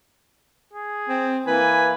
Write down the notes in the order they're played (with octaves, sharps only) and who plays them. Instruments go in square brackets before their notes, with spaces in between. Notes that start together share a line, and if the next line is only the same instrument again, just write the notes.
[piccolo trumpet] G#4
[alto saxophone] C4
[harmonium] E3 A#3 E4 [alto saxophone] B4 [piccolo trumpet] G#5